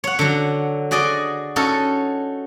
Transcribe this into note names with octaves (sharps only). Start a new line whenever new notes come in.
C#5 F#5
D3 F#3
F#4 G#4 D5 D#5
C#4 D#4 F#4 A4 G#5